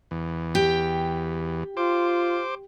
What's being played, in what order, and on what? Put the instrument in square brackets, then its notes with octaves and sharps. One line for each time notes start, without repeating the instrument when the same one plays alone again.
[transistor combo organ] E2
[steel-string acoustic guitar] G4 G5
[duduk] F4 [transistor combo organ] C5 D6